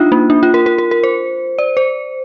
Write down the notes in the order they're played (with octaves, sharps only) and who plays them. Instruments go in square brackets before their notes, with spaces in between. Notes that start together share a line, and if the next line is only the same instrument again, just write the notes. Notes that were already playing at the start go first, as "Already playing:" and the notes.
Already playing: [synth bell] D4 D#4 F4
A#3
D4
F4
A#4
A#4
A#4
A#4
C5
D5
C5